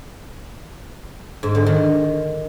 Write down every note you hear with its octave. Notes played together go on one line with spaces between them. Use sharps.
G#2
D3
D#3